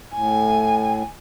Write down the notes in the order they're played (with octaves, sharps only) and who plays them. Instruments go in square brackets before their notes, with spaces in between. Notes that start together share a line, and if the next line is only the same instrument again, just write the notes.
[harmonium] A2 [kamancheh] G#5